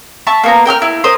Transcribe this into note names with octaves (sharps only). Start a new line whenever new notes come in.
E5 A5 C#6
A#3 B3 A#5
A#4 G5 D#6 F6
E4
A#4 C5 C6 D#6